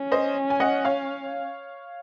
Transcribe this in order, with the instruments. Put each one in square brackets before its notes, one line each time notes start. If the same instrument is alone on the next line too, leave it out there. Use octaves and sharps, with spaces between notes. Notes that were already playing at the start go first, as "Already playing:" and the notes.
Already playing: [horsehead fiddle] C#4
[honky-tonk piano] C5 D#5
G#5
D#5 F#5
C#5 F5